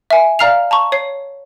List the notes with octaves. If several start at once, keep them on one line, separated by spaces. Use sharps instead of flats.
E5 G#5
D5 F5 A#5 F6 C7 F7
A5 A#5 C#6
C#5 C7